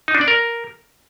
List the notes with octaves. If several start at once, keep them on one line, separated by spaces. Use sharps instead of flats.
D#4
D4
D5
A#4